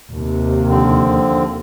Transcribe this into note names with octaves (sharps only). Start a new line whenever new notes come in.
D#2 C3
D3 F3 C4